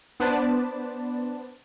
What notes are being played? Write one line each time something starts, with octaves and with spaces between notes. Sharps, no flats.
B3 D4 B4 C5 D5 A5